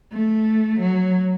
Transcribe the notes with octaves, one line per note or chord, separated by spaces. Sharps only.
A3
F#3